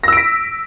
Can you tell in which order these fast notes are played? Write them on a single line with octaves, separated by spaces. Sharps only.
A#6 E6 D7 B6